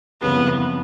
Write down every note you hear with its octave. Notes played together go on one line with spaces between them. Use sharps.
F#1 F2 C#3 E3 G3 B3